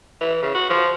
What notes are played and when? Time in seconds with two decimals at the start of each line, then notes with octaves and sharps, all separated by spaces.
0.21 E3
0.42 C#3
0.55 F#4
0.70 F3